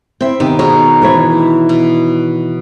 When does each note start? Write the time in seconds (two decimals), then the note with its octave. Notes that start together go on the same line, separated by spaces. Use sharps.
0.21 C4 E4 E5 G5
0.40 C3 D#3 B3 G4
0.59 B2 G#4 A#4 C#5
1.02 E3 E4 C#5
1.69 B2